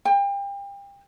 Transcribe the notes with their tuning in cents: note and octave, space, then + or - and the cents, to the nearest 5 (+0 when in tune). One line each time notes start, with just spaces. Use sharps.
G5 +30